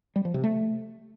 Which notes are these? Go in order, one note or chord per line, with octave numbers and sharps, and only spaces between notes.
G3
F3
C3
A3